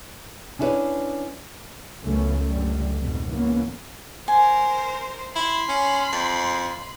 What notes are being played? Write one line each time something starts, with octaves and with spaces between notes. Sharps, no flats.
C#4 D4 E4 G4 B4 C#5
C#2 F#2 A3 B3 C#4
C#2 F#2 D3 G3 A3
F2 G#2 B2
C#2 G#2 E3 A#3 B3 C#4
A#4 C5 G#5
E4 B5 C6
C#4
F2 A5